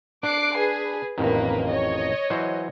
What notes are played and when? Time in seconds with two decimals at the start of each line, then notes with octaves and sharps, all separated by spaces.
0.23 D4 D6 F#6 C7
0.57 G#4 B4
1.18 A1 F2 D#3 A#3 B4
1.69 C#5 D#5
2.30 E3 F#3 C5